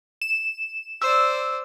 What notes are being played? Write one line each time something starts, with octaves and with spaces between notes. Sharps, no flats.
E7
C5 D5 E6